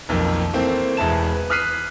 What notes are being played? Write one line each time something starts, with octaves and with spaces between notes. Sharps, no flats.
B1 F2 D#3 A#3
E3 A3 A#3 C4
E1 E2 G#3 E5 A5 E7
B4
D#6 F6 F#6 B6 C7 D#7